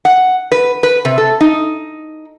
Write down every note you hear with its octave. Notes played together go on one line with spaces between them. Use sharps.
F#5
B4
B4
C3
A4
D#4